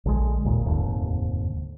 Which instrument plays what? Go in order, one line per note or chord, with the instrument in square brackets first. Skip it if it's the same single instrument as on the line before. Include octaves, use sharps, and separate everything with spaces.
[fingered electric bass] A#1 D3 D#3 G#3
G#1 D#2 A#2 D#3
F1 D#2 G#2 D3